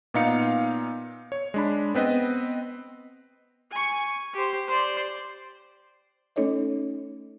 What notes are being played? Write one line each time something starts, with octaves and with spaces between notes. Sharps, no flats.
A#2 B3 D#4 F5 C#7
C#5
G#3 D4 B5
B3 C4 B4 D#5
G#5 C#6
G4 C5
C5 D5
A3 C#4 D#4 A4 C#5 D#5